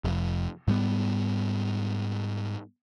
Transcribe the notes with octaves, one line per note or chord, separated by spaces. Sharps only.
F1 F2
G#2 G3 B3